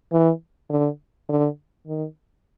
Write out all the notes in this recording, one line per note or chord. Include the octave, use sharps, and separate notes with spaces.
E3
D3
D3
D#3